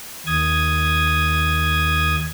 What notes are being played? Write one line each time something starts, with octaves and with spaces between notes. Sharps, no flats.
D#2 D#6 G#6